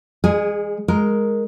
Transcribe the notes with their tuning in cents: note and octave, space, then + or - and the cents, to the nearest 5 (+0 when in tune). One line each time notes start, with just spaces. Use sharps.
G#3 -35 G#4 +0
G#3 +0 A#4 +0